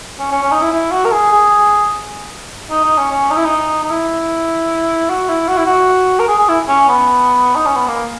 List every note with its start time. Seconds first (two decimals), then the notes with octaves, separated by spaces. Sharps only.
0.19 C#4
0.32 C#4
0.43 C#4
0.52 D#4
0.62 E4
0.72 E4
0.92 F#4
1.05 A#4
1.12 G#4
1.32 G#4
2.71 D#4
2.84 D#4
2.98 C#4
3.11 C#4
3.31 D#4
3.37 E4
3.45 D#4
3.83 D#4
3.90 E4
5.10 F#4
5.29 E4
5.48 F#4
5.58 E4
5.66 F#4
6.19 A#4
6.28 G#4
6.39 G#4
6.49 E4
6.68 C#4
6.88 B3
7.56 D#4
7.66 C#4
7.76 B3
7.88 A#3